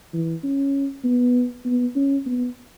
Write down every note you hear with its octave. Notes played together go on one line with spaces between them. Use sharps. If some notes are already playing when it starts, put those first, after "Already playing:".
E3
C#4
B3
B3
C#4
B3